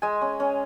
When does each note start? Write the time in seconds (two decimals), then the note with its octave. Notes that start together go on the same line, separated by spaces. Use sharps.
0.02 G#3 G#5
0.21 C#4
0.40 C#4